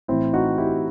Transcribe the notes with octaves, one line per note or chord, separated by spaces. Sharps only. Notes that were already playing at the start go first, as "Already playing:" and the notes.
A2 E3 C4 E4
D#4 F#4
E4 G4